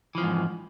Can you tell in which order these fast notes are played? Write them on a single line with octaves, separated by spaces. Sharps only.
E3 F3 F2 G#2